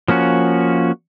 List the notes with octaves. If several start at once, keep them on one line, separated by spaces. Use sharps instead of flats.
F3 A#3 C#4 F#4